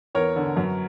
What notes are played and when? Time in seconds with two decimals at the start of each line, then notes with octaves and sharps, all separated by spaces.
0.15 E2 A#4 C#5
0.36 D3
0.57 F#2